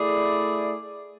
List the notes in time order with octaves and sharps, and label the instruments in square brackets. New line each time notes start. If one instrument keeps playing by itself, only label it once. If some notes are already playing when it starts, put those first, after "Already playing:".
Already playing: [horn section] A3 E4 G#4 D5